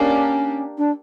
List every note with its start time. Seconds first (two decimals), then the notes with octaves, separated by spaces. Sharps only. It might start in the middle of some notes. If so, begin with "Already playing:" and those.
Already playing: A#3 C#4 D4 G4
0.78 D4